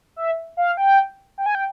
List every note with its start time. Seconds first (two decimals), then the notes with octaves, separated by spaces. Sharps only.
0.16 E5
0.57 F5
0.77 G5
1.38 G5
1.46 G#5
1.55 G5